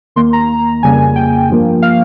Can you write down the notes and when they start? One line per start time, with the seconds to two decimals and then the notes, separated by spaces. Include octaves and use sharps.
0.16 D#2 D#3 A#3 C6
0.33 A#5
0.83 F2 C#3 G3 A#3 G#5
1.16 G5
1.49 G2 F3 A#3
1.82 F5